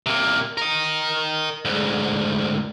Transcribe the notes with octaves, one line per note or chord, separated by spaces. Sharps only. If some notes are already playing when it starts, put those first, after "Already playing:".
C3 A#3
A#4 D#5
D2 G#2